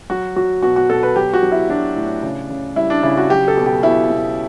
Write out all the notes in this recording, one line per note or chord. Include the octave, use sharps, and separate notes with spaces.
F#3 F#4
F#3 F#4
B2 F#4
F#4
B2 A4
B4
F#3 G4
F#4
F#3
E4
F#3 D4
A2
C#3
C#3
G3 E4
D4
C#3 E4
F#4
F#3 G4
A4
B2
G4
B2 E4
B2